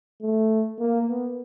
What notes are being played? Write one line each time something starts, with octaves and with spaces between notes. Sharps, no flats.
A3
A#3
B3